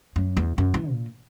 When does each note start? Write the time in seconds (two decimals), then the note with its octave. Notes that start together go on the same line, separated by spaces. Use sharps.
0.16 F#2
0.37 E2
0.58 F#2
0.74 E3
0.90 A#2